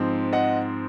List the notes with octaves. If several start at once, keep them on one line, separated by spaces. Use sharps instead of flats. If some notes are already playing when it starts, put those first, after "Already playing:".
Already playing: G#2 F3 C4
D#5 F#5